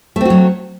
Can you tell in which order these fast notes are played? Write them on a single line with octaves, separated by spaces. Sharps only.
A3 C4 F#4 F#3